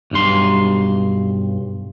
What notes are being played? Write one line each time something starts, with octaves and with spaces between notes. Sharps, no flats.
B1 G2 C6